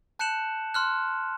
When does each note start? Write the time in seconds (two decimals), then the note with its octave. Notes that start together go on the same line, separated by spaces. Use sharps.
0.19 A5 F#6 G6 C#7 E7 F#7
0.74 C6 F6 F#6